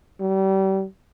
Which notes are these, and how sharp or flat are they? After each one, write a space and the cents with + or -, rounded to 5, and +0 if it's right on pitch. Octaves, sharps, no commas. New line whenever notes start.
G3 -35